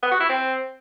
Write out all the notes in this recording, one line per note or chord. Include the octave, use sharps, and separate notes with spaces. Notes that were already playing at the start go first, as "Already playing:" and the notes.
B3
F#4
E4
C4